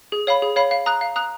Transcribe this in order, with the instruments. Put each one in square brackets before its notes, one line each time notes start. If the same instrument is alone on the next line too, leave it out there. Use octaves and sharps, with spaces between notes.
[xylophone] G#4
C#5 F5 B5
G#4
C#5 F5 B5
F5
A#5 D#6 F#6
F5
A#5 D#6 F#6